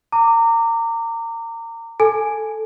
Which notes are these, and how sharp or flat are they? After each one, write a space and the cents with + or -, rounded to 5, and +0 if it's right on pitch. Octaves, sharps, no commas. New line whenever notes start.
A#5 -30 D6 +0
A4 +0 G#5 +0